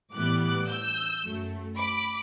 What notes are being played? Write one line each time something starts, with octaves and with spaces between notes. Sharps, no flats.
A2 E3 G3 B3 D6 F#6
E6 G6
F#2 F#3 A3
B5 D6